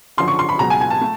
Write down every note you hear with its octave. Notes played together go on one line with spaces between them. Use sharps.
F#1 F#2 D3 F3 C6
C#6
C6
B5
C#2 B2 F#3 A#5
G#5
G#5
A5
A3